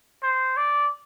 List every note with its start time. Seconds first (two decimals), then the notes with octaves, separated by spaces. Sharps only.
0.23 C5
0.57 D5